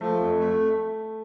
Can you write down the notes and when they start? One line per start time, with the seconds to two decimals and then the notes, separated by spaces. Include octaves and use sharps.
0.01 F3 A3
0.20 F2
0.39 A3